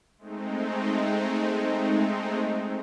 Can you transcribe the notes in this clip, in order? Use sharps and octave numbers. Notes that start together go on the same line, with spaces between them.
G#3 A3 C4 D#4